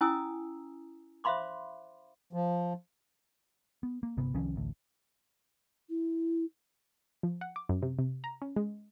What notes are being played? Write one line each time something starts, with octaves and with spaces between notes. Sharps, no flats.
C#4 E4 G#5 A#5 D#6 E6
C5 E5 F5 B5 C6 D6
F3
B3
A#3
G1 C3 B3
C2 D#3 F3 C#4
A1 D2
E4
F3
F#5
D6
F#2
C3
C3
A#5
C#4
G#3